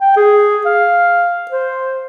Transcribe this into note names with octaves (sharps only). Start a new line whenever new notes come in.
G5
G#4
F5
C5